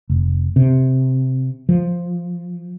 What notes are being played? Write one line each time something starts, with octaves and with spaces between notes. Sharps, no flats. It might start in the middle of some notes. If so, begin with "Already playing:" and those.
F1
C3
F3